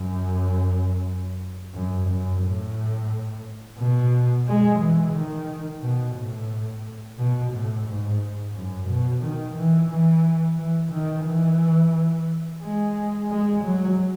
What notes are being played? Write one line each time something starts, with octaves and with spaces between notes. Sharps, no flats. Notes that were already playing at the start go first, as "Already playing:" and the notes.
Already playing: F#2
F#2
F#2
A2
B2
G#3
E3
D#3
B2
A2
B2
A2
G#2
F#2
B2
D#3
E3
E3
E3
D#3
E3
G#3
G#3
F#3